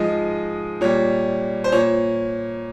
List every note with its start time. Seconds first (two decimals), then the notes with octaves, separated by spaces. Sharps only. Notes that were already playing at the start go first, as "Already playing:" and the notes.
Already playing: G#2 F3 G#3 D#5
0.81 A#2 G3 C#5
1.64 C5
1.72 A#2 C#5